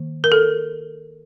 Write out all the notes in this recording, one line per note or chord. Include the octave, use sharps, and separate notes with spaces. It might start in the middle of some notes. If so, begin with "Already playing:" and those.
Already playing: D#3 A#3
A#4
A4